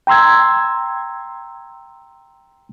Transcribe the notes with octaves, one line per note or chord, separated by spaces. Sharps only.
G5 A#5 C6 E6 G#6